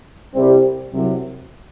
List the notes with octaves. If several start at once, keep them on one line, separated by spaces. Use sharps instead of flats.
C2 C3 G3 C4 G4
C2 C3 F#3